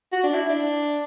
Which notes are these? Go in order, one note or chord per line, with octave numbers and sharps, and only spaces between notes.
F#4
D4
E4
D4